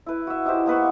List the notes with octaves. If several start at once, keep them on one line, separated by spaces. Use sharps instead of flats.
E4 B4
F#4 E5
D#4 E4 G4 C5
A#3 B3 B4 C#6